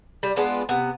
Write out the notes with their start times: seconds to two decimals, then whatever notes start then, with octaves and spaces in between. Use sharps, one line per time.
0.23 G3
0.36 G#3 B3 D4 F4
0.69 C3 B3